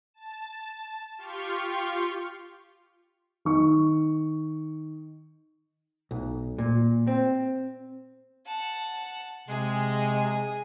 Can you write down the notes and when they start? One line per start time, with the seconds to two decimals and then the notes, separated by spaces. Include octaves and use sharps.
0.14 A5
1.17 F4 G4 C6 C#6 F6
3.45 D#3 C#6
6.11 B1
6.58 A#2
7.07 C4
8.46 F#5 A5
9.49 C3 G#3 G#4